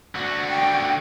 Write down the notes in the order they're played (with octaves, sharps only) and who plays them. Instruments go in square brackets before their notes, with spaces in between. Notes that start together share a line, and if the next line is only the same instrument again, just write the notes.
[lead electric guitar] D3 F#4
[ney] G5